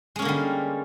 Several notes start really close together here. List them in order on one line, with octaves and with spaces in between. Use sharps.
G#3 C#4 A#3 D3 G3